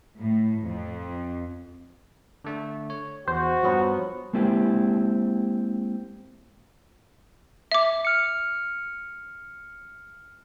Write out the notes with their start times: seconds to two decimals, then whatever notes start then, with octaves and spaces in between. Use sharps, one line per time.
0.18 A2
0.63 F2
2.44 D3 A3 D4
2.90 C#5
3.28 E2 F#4 C5
3.63 G2 F3 F#3 B3 C#6
4.33 G#3 A#3 C4 E4 G4
7.72 E5 D6
8.05 F6 C#7